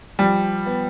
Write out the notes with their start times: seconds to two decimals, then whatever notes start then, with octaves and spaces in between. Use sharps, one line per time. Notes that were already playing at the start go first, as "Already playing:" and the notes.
0.19 F3 G3
0.66 B3